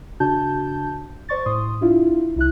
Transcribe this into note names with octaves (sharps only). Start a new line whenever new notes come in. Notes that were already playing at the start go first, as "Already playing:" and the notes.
C#3 D4 F#4 A5 G6
C5 D5 C#6 A6
A2 C6 D#6
D4 E4 F4
C2 E4 F#6